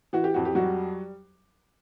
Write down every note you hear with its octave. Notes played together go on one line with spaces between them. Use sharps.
E3 F#4
G4
F2 F#4
G4
F#3 G3 F#4